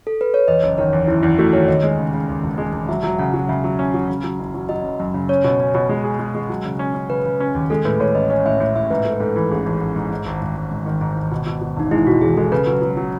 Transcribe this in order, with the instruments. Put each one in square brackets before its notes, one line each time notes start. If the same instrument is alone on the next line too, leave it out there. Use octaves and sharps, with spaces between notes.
[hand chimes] A4
B4
C#5
[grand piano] E2 [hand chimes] D#5
[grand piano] F#1
[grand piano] D#3 [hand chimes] C#5
[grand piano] E2
[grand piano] F#1 [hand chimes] E4
[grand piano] E2 [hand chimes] E4
[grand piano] A3 [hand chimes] F#4
[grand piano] D#3 [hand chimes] C#5
[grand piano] D#2 [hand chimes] D#5
[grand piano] G#3
C#3
C#3
D#2
E1
G#3
E1
[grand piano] F#3 [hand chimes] E5
[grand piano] F#3
[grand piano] C#3 [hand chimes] F#5
[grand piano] F#3
[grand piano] C#3 [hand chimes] E5
[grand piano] F#3
C#4
F#3
C#3
F#3
F#1
F#3
[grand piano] F#3 [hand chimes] D#5
[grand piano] F#2
F#2
C#3
[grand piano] C#4 [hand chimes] C#5
[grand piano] B2
C#4
B2
G#3
G#4
G#3
G#3
F#3
C#3
C#4
C#4
[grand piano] C#3 [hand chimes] B4
[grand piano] C#3
C#4
D#2
[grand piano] G#3 [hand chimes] A4
[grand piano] A2 [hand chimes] B4
[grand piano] A2 [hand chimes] C#5
[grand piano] A1 [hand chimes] D#5
[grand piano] C#4 [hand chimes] C#5
[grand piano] A2 [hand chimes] E5
[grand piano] A2
[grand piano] A2 [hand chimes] E5
[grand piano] G#2 [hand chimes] B4
[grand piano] A3
[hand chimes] B4
[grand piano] G#2 [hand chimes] A4
[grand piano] E3
[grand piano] A1 [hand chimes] G#4
[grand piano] A1
A1
G#2
G#2
G#1
G#1
G#1
G#2
D#3
G#2
G#1
B2
B2
B2
[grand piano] E1 [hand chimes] D#4
[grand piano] G#3 [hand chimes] E4
[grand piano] B2 [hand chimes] F#4
[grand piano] E2 [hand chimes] G#4
[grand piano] G#3 [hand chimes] A4
[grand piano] C#3 [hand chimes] B4
[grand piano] F#3
F#3
F#3